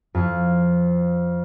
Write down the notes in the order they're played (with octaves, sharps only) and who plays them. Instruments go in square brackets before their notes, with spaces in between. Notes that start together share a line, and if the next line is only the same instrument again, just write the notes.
[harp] F2